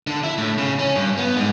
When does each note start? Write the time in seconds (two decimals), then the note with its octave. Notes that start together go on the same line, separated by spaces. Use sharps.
0.07 D3
0.23 E4
0.38 A2
0.58 C#3
0.79 C#4
0.96 G2
1.18 B3
1.37 G#2